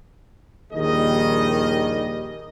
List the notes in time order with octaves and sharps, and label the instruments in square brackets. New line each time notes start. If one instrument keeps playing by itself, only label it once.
[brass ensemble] A#1 D#2 D#3 G3 G#4 D#5